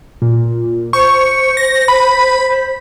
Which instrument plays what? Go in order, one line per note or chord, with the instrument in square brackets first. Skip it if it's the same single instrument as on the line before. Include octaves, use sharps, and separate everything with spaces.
[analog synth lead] A#2
[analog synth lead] C5 [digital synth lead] C#6
[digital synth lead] A#6
B5